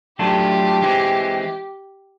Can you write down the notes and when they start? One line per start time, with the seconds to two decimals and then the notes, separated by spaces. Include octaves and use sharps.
0.19 F#3 A3 D4 F4 G4 A4
0.82 E3 G#3 C4